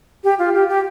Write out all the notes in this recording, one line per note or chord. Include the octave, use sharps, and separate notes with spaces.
G4
F4
G4
G4